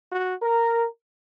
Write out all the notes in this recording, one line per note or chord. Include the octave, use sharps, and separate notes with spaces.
F#4
A#4